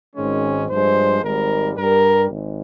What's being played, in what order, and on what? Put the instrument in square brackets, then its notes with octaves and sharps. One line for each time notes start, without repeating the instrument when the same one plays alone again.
[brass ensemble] G#1 G#2 D#3 G#3 C#4
G2 F3 G#3 C5
G#1 G#2 G3 A#4
G2 G3 A#4
G#1 G#2